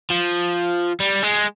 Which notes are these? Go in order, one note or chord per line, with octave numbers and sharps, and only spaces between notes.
F3
G3
G#3